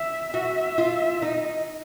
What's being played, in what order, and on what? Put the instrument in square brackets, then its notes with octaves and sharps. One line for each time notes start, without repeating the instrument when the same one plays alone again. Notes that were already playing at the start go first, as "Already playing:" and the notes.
Already playing: [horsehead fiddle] E5
[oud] F#4 [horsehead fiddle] E5
[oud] F4
[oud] D#4 [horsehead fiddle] D#5